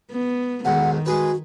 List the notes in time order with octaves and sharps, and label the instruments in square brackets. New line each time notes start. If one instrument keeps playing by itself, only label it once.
[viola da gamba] B3
[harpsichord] B1 E2 G#2 [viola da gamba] D#3 [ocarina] F#5
[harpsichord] G#3 G#4 B4 [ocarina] F#4